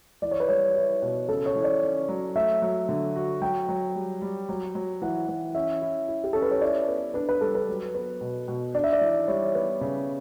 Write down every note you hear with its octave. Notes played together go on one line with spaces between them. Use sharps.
E3 D5
C#5
B4
G3 C#5
E4
B2
C#3 A4
C#5
E3
D5
C#4
F#3
A3 E5
F#3
D3
F#4
F#3 G5
F#3
G3
G3
F#3
F#3
E3 F#5
E3
C#4 E5
E4
E4
G4
C#4 A4
B4
C#5
E4 D5
B3
D4 B4
B4
G3 A4
B4
F#3
B3
B2
B2
D4 D5
E5
D5
E3
G3 C#5
B3
C#3